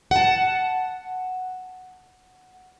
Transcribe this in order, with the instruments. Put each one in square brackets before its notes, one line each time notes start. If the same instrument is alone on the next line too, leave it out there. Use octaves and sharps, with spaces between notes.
[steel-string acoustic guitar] F#5 A5